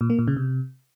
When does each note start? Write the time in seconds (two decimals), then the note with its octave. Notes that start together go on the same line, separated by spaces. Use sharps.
0.01 A#2
0.10 A#3
0.19 A#2
0.28 C#3
0.36 C3